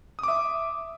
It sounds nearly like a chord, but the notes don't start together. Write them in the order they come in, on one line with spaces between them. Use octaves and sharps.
D#6 D6 E5